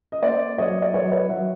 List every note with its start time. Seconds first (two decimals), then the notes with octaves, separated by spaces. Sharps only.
0.12 D#5
0.22 A#3 C5 D5
0.58 F#3 C#5 D#5
0.82 D5
0.93 F#3 C#5 D#5
1.11 B4 C#5
1.29 F#3 E5 F#5